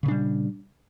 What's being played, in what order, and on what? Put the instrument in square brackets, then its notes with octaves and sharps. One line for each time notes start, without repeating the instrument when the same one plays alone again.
[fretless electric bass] C#3
A#2
D4
G3